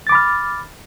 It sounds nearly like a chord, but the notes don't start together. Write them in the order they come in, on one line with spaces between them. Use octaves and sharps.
A6 D6 B5 F6